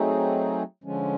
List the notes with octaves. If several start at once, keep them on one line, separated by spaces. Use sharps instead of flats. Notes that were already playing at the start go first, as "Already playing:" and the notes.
Already playing: F#3 A3 C4 D#4 G#4
D3 F3 G#3 C#4